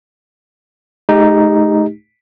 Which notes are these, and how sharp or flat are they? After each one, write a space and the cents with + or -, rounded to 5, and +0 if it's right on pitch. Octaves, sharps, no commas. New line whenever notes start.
A3 -45 D#4 +0 G4 +20